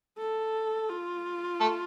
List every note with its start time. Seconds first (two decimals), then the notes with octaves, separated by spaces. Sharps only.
0.18 A4
0.89 F4
1.61 A3 A4